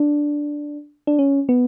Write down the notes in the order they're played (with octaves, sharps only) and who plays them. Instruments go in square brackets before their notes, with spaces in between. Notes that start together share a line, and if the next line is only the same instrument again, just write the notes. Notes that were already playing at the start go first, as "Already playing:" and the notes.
Already playing: [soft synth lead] D4
D4
C#4
B3